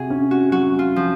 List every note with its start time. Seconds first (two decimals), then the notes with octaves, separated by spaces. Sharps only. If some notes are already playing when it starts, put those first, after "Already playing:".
Already playing: C3 F#4 G#4
0.10 C#4
0.31 F#4
0.52 F#3 F#4
0.79 F4
0.96 F3